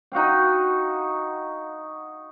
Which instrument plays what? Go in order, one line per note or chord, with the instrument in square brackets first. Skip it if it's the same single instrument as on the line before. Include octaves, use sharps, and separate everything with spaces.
[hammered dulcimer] D#4 F#4 F5 G5